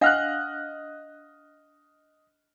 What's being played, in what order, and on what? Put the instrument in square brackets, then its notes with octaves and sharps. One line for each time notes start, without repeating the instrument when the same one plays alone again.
[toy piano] D4 F5 F#5 [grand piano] D#5 F6 F#6